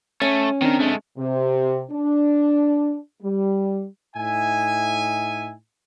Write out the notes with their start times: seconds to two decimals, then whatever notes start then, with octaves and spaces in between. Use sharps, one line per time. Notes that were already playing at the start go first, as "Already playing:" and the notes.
0.22 A3 C#4
0.62 D#3 C4 D4 A#4
0.80 G#3 A3
1.18 C3
1.91 D4
3.23 G3
4.16 A2 D#4 E5 G#5